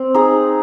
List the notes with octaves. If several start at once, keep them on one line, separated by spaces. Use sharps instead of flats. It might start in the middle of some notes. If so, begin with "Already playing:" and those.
Already playing: C4
D#4 G#4